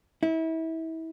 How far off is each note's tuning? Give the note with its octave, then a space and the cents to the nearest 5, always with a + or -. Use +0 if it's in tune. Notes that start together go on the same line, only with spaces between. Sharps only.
E4 -30